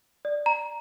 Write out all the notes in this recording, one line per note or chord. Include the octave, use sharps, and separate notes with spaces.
D5
A#5